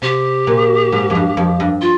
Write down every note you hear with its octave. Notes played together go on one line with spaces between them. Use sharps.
C3 G4
A#2
G#2
F2
G2
F2
G2
F4